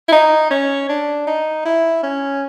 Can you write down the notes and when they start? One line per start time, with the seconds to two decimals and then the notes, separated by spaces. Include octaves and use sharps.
0.08 E4
0.12 D#4
0.51 C#4
0.89 D4
1.27 D#4
1.65 E4
2.03 C#4